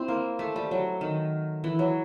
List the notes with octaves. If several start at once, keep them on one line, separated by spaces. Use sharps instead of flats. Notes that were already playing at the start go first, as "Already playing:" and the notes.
Already playing: C4 E4
A#3
A3
G3
F#3
D#3
E3
F#3